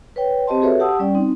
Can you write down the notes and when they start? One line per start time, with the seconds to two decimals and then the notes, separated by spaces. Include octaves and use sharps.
0.16 B4 C#5 G5
0.47 C4 G4 C5 D#5 A5 C6
0.61 F#4 G#4 A4 B4 C#5 E5
0.80 G4 F#5 A5 D#6 E6
0.99 G3 C#4 D5 G5
1.15 C4 D#4